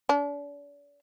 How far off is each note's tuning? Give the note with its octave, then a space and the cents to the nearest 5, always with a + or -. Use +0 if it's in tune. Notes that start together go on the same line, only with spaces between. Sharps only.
D4 -40